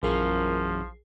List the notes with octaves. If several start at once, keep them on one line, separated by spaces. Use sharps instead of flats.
A#1 F#2 A#2 E3 F3 C#4 G#4 C7